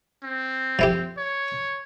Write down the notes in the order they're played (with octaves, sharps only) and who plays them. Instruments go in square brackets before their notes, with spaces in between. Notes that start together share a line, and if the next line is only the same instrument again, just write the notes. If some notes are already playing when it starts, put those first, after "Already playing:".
[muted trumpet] C4
[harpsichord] F3 E4 G4
[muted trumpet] C#5